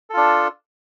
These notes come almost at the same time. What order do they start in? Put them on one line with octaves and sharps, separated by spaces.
A4 F4 D4